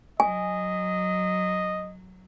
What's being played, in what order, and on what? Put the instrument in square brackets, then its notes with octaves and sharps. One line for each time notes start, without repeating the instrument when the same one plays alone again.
[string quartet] F#3 [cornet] D#5 [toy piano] G#5